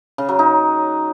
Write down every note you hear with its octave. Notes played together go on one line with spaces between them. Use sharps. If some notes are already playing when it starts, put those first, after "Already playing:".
C#3
F#3
D#4